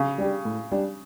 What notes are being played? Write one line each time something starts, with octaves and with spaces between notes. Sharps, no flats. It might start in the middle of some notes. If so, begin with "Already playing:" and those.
Already playing: C#3
G3 D4 G4
A2
G3 D4 G4